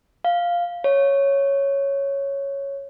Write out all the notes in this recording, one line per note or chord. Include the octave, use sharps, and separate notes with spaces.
F5
C#5